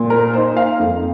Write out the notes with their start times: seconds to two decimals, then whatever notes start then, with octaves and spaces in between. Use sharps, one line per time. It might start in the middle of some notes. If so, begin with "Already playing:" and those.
Already playing: A#2
0.10 A#4
0.33 A#3 C5
0.36 D#4
0.57 F5
0.80 F2